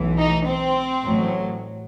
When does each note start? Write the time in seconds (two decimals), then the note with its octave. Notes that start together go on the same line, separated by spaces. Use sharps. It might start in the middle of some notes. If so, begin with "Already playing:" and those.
Already playing: B1 A2 E3
0.18 D#4
0.47 C4
1.03 A1 A2 F#3